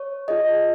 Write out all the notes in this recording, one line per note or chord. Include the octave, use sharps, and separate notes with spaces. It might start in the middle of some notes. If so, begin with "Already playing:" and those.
Already playing: C#5
F4 G#4 D#5